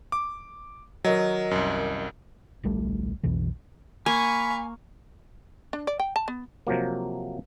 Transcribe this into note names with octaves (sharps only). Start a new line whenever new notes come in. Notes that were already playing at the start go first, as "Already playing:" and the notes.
D6
D#3 F#3 A#4 D#5
C2 F#2
D1 A#1 G3 A3
B1 F2 B2 E3
A#3 F5 G#5 B5 C#6
D4
D5
G5
A5
B3
C3 F3 F#3 A#3